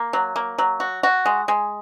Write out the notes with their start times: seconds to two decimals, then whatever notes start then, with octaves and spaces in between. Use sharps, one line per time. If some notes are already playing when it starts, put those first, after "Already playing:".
Already playing: A#3
0.13 F#3
0.36 A#3
0.58 F#3
0.80 F#4
1.03 F#4
1.25 G#3
1.48 G#3